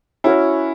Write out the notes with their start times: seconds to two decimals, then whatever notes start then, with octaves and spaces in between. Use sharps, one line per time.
0.24 C#4 E4 F#4 A#4 C#5